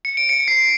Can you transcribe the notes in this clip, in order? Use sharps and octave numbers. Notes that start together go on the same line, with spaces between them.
C#7
D7
C#7
C7